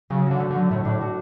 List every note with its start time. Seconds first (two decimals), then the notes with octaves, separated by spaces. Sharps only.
0.10 C#3 F#3
0.26 D3 F#4
0.40 A3
0.51 D3 F#3
0.71 A2 A3
0.85 A2 D4
1.01 F#4